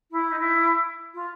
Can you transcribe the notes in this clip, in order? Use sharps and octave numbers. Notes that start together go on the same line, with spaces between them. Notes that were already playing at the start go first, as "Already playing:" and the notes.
E4
D#4
E4
F4